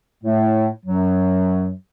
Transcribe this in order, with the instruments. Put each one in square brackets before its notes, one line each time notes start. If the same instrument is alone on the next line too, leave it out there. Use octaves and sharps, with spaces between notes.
[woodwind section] A2 A3
F#2 F#3